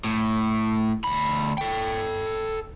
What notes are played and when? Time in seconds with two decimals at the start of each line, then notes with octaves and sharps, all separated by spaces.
0.04 A2
1.04 D2 B5
1.58 A4 G5